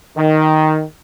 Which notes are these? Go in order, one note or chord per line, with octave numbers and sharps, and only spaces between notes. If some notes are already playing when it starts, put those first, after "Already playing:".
D#3